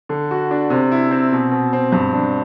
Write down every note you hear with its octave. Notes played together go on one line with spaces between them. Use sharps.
D3
F#4
D4
C3
E4
C4
B2
B2
C4
G2
D4